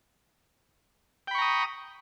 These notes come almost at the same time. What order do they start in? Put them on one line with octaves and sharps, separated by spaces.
G5 B5 C#6 A#5 D#6